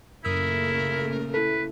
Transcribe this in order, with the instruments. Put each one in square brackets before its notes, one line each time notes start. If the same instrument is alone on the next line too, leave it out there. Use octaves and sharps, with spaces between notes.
[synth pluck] F#2 D#6 E6 [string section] A#2 C#3 A3 [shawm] E4 [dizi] A#4
[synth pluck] E4 A4 [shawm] B4